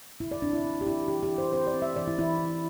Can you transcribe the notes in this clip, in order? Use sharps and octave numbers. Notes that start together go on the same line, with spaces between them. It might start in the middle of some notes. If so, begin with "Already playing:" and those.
D3 E4
D5
C4 D4
E4
C4
G4
C4 E4
E3 G4
G4
E3
C5
C4 C5
D5
C4
E5
E3 D5
E4
E3 E4